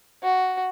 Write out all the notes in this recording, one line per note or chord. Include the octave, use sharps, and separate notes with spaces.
F#4